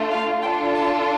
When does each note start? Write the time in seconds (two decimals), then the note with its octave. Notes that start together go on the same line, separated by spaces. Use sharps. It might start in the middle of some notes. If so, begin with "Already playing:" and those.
Already playing: A3 D4 F4
0.10 F5
0.42 D4 F4 A4 G5
0.73 A5